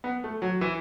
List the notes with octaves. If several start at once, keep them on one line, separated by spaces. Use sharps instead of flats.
B3
A3
F#3
E3